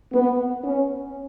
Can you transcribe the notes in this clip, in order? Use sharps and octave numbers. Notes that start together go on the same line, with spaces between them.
B3
C#4